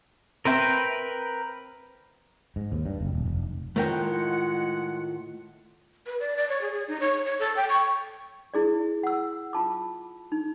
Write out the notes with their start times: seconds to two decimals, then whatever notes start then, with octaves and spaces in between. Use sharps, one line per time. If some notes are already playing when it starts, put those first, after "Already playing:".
0.45 C4 A#4 B4 E5 G5
2.56 G#2
2.72 D#2
2.86 G2
3.01 F#1
3.13 D#1
3.26 F1
3.76 A2 D#3 G#3 A3 F4 A#4 F#5 G5
6.06 B4
6.20 D5
6.37 D5
6.49 C#5
6.61 G#4
6.73 G#4
6.88 D#4
7.00 C#5
7.25 C#5
7.39 A4
7.56 G5
7.69 C#6
8.54 E4 G#4 D5
9.03 F#5 E6
9.53 F4 A5 D6
10.32 D#4